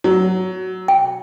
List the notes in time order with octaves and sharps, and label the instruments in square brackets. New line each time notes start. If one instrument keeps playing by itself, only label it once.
[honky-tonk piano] F#3
[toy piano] G5